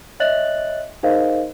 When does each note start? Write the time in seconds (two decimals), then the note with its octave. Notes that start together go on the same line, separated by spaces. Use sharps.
0.20 C#5 D#5 E5 F#6 A6 F#7
1.03 D#4 G#4 A#4 C5 D#5 F5